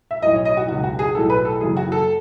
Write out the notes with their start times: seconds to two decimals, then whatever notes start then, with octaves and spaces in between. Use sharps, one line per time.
0.11 E5
0.22 B1 A2 F#3 D#5
0.34 C#5
0.45 D#5
0.57 F#4
0.68 C#2 B2 F#3 F#4
0.83 F#4
0.99 G#4
1.15 B1 A2 F#3 A4
1.30 B4
1.45 A4
1.61 F#1 F#2 E3 G#4
1.77 F#4
1.92 A4